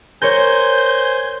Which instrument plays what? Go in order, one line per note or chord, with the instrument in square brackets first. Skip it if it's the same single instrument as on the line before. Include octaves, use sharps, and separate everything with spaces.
[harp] A#4 C#5 [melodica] C5 G#5 [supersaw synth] G6